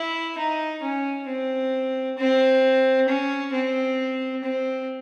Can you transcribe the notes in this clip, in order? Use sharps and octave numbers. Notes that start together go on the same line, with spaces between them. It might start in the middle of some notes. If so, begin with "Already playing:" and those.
Already playing: E4
D#4
C#4
C4
C4
C#4
C4
C4